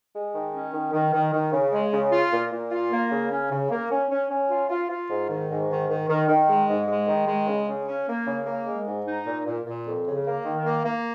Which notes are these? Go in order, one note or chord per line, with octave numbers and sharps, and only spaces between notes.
G#3
D#3
C#4
D#3
D#3
D#3
D#3
C#3
G#3
C#3
F4
A#2
A#2
F4
A#3
C#3
C#4
C#3
A#3
C#4
C#4
C#4
F4
F4
F4
G#2
D#3
G#2
D#3
D#3
D#3
D#3
G#3
G#2
G#3
D#3
G#3
C#3
C#3
C#4
A#3
C#3
A#3
G#3
G#2
D#4
A#2
A#2
A#2
F2
C#3
A#3
D#3
A#3
A#3